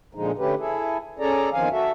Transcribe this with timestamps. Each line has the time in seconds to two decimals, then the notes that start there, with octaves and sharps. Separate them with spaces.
0.15 A#2 D3 F3 G#3 D#4
0.39 D3 A3 C#4 G4 B4
0.58 E4 G#4 A4
1.19 C#4 G#4 A4 D5 A#5
1.53 E2 D#3 F3 C4 F5 G#5
1.71 F#4 A4 E5